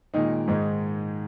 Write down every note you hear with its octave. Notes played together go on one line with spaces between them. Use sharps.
A#2 D#3 G#3 D#4
G#2 D#3 G#3